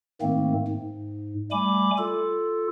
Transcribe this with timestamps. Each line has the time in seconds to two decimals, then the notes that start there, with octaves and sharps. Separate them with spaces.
0.22 G#2 D#3 A3 A#3 C4
0.68 G#2
1.51 G3 A3 G#5 B5 D6
1.98 F4 A4